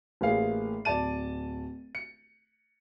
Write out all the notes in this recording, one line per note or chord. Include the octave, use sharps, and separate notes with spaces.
A1 A2 A#3 G#4 F5 C7
D1 D5 A5 D#7
C#7